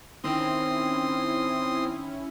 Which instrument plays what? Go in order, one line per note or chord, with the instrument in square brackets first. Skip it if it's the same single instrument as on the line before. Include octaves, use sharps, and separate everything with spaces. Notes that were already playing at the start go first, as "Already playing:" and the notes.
[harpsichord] D#3 [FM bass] C4 [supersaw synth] C#4 E4 [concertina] C6 D#6